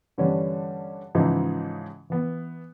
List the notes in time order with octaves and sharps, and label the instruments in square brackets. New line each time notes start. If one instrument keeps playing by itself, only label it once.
[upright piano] G2 D3 E3 G3 C#4
G#2 C#3 E3 F3 D#4 E4
E3 B3